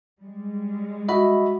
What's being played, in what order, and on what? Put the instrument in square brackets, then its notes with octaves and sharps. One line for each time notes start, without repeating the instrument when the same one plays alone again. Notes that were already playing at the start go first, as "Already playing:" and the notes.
[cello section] G3 G#3
[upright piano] F#4 [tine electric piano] D#5 E5 B5